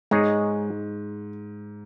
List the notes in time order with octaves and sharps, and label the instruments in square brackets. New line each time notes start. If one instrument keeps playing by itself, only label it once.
[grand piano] G#2 [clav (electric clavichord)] G#3 D#4 G#4 C#5